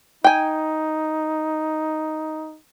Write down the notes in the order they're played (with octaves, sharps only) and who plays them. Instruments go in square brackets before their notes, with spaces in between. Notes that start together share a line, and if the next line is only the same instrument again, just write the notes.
[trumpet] D#4 [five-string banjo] G5 G#5